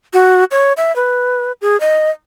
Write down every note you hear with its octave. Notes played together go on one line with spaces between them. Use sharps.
F#4
C#5
E5
B4
G#4
D#5